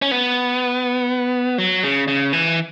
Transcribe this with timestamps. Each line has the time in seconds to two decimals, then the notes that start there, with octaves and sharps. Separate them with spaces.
0.02 C#4
0.11 B3
1.58 F#3
1.83 C#3
2.08 C#3
2.33 E3